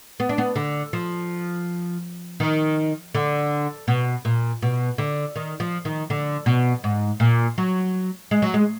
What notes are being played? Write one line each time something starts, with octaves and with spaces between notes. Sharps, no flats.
B3
D4
B3
D3
F3
D#3
D3
B2
A#2
B2
D3
D#3
F3
D#3
D3
B2
G#2
A#2
F#3
G#3
F#3
G#3